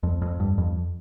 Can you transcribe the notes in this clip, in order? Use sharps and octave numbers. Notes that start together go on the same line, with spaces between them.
F2
F2
G2
F2